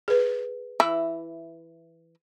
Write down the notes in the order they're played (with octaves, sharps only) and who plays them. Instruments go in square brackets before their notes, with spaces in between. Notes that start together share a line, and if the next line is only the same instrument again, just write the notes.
[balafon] G#4 B4
[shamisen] E3 E4